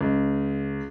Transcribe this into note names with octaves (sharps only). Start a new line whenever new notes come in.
C#2